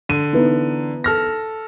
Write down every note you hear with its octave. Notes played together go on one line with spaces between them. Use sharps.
D3 D#7
E3 B3 D#4
A4 F6 A#6